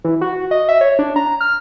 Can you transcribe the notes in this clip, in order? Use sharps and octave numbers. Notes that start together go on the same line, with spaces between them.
E3
F#4
D#5
E5
C#5
D4
A#5
F6